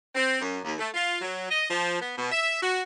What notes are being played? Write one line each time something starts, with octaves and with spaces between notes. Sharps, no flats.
C4
F#2
D#2
A3
F4
F#3
D#5
F3
B3
B2
E5
F#4